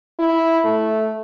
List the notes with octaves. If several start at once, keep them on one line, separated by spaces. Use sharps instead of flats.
E4
A3